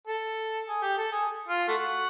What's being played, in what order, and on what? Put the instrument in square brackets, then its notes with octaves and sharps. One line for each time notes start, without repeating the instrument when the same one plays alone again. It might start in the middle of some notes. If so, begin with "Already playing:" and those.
[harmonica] A4
G#4
G4
A4
G#4
F4
A3 F#4